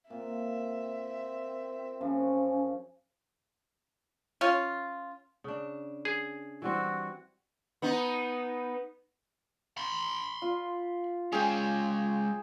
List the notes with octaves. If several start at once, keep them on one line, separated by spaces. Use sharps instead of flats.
A#2 C4 E5
F#2 C#3 F3 C#4
C#4 F4
C#3 D4
G#4
E3 G3 C4 F#4
B3 D#4
B5 C6
F4
G#3 C#4 G#4 G5